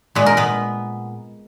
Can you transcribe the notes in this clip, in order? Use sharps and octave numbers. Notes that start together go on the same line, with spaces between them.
A#2 G#3 B3 B4
A#4
B3 B4